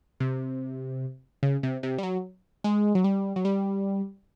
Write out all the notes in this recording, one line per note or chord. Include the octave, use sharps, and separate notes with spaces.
C3
C#3
C3
C3
G3
F#3
G#3
F#3
G3
F#3
G3